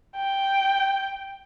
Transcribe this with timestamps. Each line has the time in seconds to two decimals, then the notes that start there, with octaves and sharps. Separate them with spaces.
0.17 G5